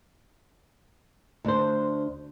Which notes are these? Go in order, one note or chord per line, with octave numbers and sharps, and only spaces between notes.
D2 D4 C5